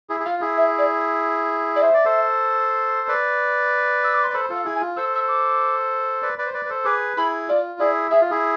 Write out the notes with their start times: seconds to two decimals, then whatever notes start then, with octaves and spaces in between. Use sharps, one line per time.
0.10 E4 G#4
0.20 G#4
0.25 F4 F5
0.41 E4 G#4
0.57 E5
0.78 D5
1.76 D5
1.82 C5 E5
1.94 D5
2.05 A4 C5
3.08 B4 D5
4.04 E6
4.14 D6
4.24 C6
4.30 D5
4.34 A4 C5 B5
4.50 F4 A4
4.55 F5
4.65 E4 G#4
4.76 G#5
4.81 F4
4.96 A4 C5 E6
5.14 E6
5.28 D6
6.23 B4 D5
6.38 B4 D5
6.46 C5
6.54 B4 D5
6.65 B4
6.70 A4 C5
6.85 G#4 B4 D6
7.17 E4 G#4 B5
7.48 F4 D5
7.79 E4 G#4 D5
8.11 G#4 E5
8.21 F4
8.31 E4 G#4